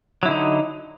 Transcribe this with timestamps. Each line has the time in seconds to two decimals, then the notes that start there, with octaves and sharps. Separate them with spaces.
0.23 F#3
0.25 E4
0.28 D3
0.31 D#4